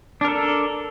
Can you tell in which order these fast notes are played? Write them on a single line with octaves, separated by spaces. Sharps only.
D4 A#4 A4